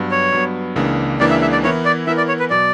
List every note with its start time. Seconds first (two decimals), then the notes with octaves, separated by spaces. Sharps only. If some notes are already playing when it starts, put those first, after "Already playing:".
Already playing: G2 F#3 B3
0.11 C#5
0.32 G2 F#3 B3
0.75 C#2 C#3 E3 A#3 D4
1.20 C#2 C#3 E3 A#3 D4 D5
1.30 E5
1.41 E5
1.52 D5
1.63 E3 B3 E4 A#4 C#5
1.85 D5
2.07 E3 B3 E4 A#4 E5
2.17 D5
2.28 C#5
2.39 B4
2.50 B2 F#3 D5